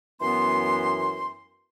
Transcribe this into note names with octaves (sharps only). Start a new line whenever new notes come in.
F#2 E3 B3 C6